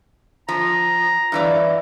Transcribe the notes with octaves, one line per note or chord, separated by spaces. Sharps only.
F3 A#5
G2 E3 D5